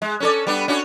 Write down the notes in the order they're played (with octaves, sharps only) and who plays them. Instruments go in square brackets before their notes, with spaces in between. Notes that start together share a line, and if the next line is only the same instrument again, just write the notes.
[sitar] G#3
C#4 A4 D5
G3 B3 D4
C#4 D4 F#4